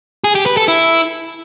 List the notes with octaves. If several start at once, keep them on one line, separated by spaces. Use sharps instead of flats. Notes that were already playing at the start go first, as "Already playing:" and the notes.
G#4
G4
B4
A4
E4